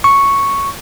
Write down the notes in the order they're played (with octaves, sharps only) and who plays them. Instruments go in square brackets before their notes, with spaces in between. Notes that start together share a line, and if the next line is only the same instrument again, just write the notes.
[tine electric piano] C#6